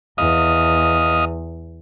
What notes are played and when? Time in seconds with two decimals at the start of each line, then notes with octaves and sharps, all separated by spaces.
0.18 E2 D#5 F5 D#6